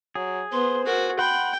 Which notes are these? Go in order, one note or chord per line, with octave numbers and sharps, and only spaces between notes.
F#3 G#4
B3 C5 C6
F#4 A#4
F#5 G5 B5 C6